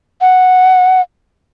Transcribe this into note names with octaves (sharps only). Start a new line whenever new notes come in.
F#5